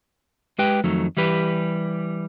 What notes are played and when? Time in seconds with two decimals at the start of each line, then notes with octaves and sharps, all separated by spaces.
0.58 G#3 G4 B4 G5
0.84 F2 D#3 F#3 A3
1.17 E3 G3 G4 B4